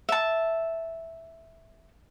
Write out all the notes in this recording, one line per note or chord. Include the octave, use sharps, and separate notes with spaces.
E5 A5